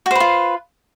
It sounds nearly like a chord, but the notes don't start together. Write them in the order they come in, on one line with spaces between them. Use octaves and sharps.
F#4 C5 B4 F4